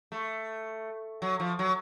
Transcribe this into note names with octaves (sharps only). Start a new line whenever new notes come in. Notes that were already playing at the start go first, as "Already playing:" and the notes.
A3
F#3
F3
F#3